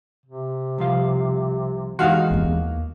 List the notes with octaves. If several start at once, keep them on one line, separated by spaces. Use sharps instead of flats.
C3
C2 F3 F5
E3 G#3 D#4 F#4 F5
D#2 A#3 B3